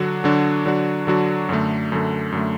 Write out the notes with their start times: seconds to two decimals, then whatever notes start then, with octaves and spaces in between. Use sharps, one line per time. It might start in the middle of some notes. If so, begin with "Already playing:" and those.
Already playing: D3 F#3 D4 F#4
0.24 D3 F#3 D4 F#4
0.66 D3 F#3 D4 F#4
1.07 D3 F#3 D4 F#4
1.49 F#2 D3 A3
1.92 F#2 D3 A3
2.32 F#2 D3 A3